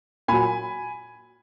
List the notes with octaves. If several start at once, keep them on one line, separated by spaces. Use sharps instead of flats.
A#2 F#3 G#5 B5